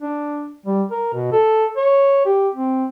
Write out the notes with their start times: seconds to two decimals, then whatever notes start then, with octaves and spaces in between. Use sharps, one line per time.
0.01 D4
0.66 G3
0.91 A#4
1.14 B2
1.32 A4
1.77 C#5
2.26 G4
2.54 C4